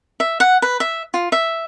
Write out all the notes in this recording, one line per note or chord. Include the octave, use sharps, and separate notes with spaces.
E5
F#5
B4
E5
F4
E5